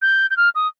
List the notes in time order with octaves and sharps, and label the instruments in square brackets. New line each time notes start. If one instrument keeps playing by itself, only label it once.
[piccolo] G6
G6
F6
D#6